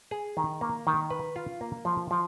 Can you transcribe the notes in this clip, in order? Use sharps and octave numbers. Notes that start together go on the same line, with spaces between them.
G#4
D#3
A#3
D#3
B4
F4
A#3
F3
F3